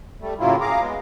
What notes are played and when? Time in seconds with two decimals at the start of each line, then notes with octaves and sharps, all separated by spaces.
0.21 G3 A3
0.40 A2 C#3 F#3 A#3 E4 F4
0.61 G#4 F5 A#5 D6
0.81 G#3 B3